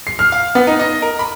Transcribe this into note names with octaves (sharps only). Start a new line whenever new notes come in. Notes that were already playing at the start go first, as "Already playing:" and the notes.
C7
F6
F5
B3
D#4
D#5
A#4
B5